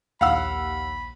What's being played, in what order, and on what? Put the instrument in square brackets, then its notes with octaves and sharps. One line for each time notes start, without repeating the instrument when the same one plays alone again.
[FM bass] A#1 [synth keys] D#2 [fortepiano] F5 F#5 E6 [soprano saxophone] B5